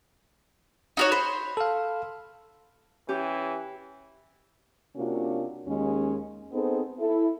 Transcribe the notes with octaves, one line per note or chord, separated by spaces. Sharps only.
D#4 F#4 C#5
C5 B5
A4 F5
E3 C#4 G4
C3 A#3 C#4 D4 F4 F#4
D#2 G#3 C#4
B3 C4 D#4 G#4 A4 C5
E4 A4